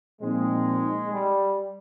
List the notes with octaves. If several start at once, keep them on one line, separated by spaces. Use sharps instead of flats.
A#2 F3 G#3 C4 D#4
G3